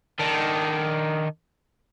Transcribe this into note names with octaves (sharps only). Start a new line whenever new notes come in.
D#3 D4